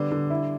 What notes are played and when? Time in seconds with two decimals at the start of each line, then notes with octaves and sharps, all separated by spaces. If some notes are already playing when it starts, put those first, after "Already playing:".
Already playing: D3 G3 B3
0.12 D3
0.30 E4